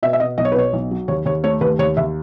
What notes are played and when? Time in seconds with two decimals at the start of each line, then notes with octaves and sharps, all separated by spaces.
0.03 B2 E5
0.13 E5
0.20 B2 D#5
0.38 B1 D#5
0.45 C#5
0.52 B4
0.55 B2 C#5
0.73 B1
0.91 F#3
1.08 D#2 C#5
1.25 D#2 C#5
1.44 A3 C#5
1.61 D#2 B4
1.79 D#2 C#5
1.97 D#2 E5